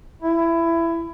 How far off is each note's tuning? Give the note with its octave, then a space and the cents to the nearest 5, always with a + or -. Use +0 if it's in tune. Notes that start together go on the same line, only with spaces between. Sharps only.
E4 +20